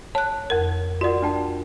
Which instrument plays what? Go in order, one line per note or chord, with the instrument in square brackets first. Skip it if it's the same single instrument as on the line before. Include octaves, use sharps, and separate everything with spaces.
[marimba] C#5 F#6 [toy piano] A5
[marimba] F2 A#4
[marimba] F4 A#4 [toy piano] F#4 D5 F#5
[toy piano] D4 G5 A5